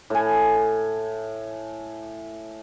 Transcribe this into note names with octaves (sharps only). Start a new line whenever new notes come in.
A2 G#5